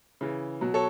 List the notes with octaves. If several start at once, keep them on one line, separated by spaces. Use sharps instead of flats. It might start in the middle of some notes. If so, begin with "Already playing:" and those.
C#3 E3
B2 F#3
A4 C#5